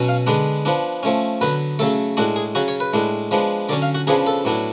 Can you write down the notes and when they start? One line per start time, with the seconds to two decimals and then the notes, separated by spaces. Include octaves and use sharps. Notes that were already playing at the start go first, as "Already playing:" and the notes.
Already playing: B2 F#3 C#4
0.08 F5
0.27 D3 G#3 B3 D4
0.65 F3 B3 D4
1.03 F3 A3 C#4
1.41 D3 F#3 B3 B4
1.79 C#3 F#3 A3 A4
2.17 A2 G#3 D4 F#4
2.36 G#4
2.55 C#3 F#3 C#4 F#4
2.68 C#5
2.80 B4
2.93 A2 G#3 D4
3.31 F3 G#3 B3 D4
3.69 D3 F#3 C#4 D5
3.82 F5
3.95 F#4
4.07 C#3 F3 B3 D4 G#4
4.27 A4
4.45 A2 F#3 B3 D4